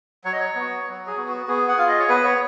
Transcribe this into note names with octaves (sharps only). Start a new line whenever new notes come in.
F#3 C#5
D#5
C#5
B3
F#4
F#3
G#4
B3 F#4
F#4
B3 G#4
F#5
F4 F5
D#5
C#5
B3 B4
C#5